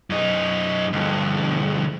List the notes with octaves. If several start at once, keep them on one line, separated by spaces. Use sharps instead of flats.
F#2 D#4
D2 G2